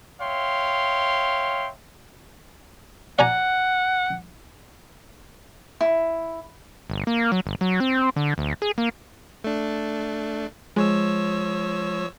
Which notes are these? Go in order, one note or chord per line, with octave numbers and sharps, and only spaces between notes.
C#5 E5 F5 G5 C6
D5 F#5 G#5 A#5
E4
G1
A#3
F#3
G1
F#3
C4
D3
D2
G#4
A#3
A3 D4
F3 G#3 C#5 E6